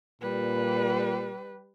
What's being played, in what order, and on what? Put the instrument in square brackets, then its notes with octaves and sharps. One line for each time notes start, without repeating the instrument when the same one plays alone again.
[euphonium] A#2 [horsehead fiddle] G3 B4